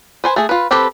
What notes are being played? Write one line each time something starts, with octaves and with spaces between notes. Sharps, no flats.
B4 C5 G#5
A3 G#4
F4 B4
C4 G4 A4 B4